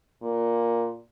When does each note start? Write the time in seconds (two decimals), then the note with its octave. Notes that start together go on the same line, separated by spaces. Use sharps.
0.22 A#2